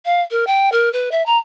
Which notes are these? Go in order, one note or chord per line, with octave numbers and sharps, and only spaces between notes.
F5
A#4
G5
A#4
B4
E5
A#5